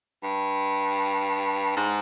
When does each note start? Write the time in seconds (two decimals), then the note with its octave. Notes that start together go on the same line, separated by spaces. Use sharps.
0.23 G2
1.76 G#2